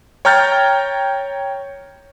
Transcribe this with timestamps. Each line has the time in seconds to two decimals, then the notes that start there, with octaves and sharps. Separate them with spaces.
0.25 C#5 G5 A#5 F6 G6 A6